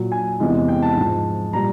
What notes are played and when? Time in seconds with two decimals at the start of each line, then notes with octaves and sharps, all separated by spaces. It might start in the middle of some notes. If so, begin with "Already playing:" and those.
Already playing: A#2 F#3
0.12 G#5
0.40 E2 C3 E3 G#3
0.68 G5
0.82 A5
0.96 G#2 F3 G#3
1.53 A#2 G3 A#5